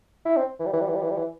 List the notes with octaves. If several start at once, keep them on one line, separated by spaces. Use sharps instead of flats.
E4
C4
E3
G3
E3
G3
E3
G3
E3
G3
E3